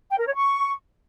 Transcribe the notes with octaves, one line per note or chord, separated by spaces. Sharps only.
G5
A#4
C#5
C#6